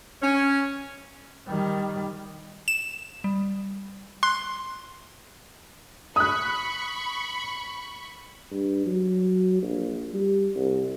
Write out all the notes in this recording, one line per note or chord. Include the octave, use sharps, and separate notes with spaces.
C#4
D#3 G3
E7
G3
C6 F#6
B5 C#6 D#6 F#6
G2
F#3
A#1
G3
C2